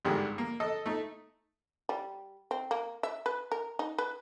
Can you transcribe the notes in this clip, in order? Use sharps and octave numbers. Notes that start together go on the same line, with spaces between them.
G#1 G2 D3 D#3 G3 G#3
A#3
A4 D#5
A3 D#4
G3
C4
A#3
E5
B4
A#4
D#4
B4